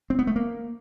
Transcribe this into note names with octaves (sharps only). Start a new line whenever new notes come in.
C4
B3
A3
A#3